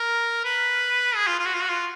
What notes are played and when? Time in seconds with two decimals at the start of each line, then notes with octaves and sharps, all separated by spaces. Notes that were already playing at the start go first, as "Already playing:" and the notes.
Already playing: A#4
0.44 B4
1.15 G#4
1.27 F4
1.39 F4
1.46 F#4
1.54 F4
1.61 F#4
1.69 F4